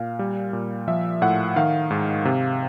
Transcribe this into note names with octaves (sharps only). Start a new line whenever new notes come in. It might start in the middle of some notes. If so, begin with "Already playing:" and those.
Already playing: A#2 F5
G3
A#2
F3 E5
A2 F#5
D#3 F5
G#2
C3